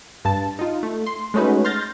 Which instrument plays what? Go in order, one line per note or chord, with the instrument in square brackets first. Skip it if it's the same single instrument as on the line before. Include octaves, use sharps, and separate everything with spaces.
[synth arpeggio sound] G2 A5
D#4 F4
A3
C6
G#3 A3 C#4 D#4 F#4 B4
C6 F6 G6 A6 A#6